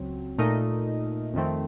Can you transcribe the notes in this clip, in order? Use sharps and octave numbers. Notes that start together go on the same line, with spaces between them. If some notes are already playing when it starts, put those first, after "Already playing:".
Already playing: C#2 F#3 C4
A#2 A3 D#4 A#4 D#5
F2 D#3 A3 C4